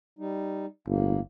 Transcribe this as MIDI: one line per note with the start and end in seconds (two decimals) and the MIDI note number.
0.19 0.66 55
0.19 0.66 63
0.87 1.18 31
0.87 1.20 45
0.87 1.20 58